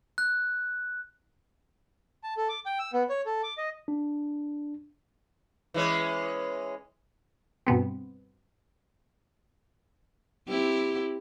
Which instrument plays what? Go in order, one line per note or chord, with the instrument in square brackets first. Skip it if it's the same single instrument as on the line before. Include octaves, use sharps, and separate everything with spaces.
[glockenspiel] F#6
[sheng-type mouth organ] A5
A4
D6
G5
E6
B3
C#5
A4
D6
D#5
[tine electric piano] D4
[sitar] E3 G#3 C#4
[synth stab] G2 B2 B3 C4
[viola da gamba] C4 E4 G4